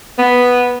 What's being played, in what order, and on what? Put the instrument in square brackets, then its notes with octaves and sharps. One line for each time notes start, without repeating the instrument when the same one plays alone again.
[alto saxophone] B3